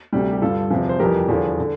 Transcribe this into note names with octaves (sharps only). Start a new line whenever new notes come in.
D2 C3 G3
G4
G2 D3 G3 F4 A4
E2 C3 F3
C5
F2 E3 G3 G4 A#4
E2 D3 F3
D3